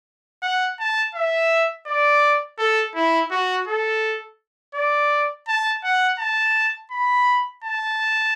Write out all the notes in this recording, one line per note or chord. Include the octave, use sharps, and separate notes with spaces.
F#5
A5
E5
D5
A4
E4
F#4
A4
D5
A5
F#5
A5
B5
A5